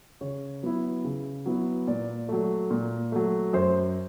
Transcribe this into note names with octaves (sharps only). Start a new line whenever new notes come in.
C#3 C#5
F#3 B3 E4
C#3
F#3 B3 E4
A#2 D5
F#3 A3
A#2
F#3 A3
F#2 C5